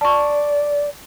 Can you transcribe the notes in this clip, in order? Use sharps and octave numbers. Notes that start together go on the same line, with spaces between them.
D5 A5 C#6